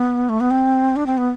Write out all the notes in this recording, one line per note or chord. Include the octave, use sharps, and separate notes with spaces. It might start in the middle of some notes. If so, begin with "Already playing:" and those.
Already playing: B3
A3
B3
C4
D4
C4
B3